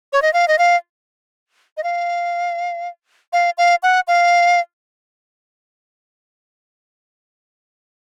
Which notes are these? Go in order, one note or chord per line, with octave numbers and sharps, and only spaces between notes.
C#5
D#5
F5
D#5
F5
D#5
F5
F5
F5
F#5
F5